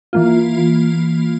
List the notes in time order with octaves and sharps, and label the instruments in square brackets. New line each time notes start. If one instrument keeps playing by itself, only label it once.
[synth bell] E3 A#3 F4